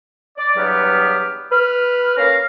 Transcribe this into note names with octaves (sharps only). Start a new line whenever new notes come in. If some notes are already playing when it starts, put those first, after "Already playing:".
D5
E2 G2 F#3 B3 G4 F6
B4 F6
A#3 C#4 A#4 F5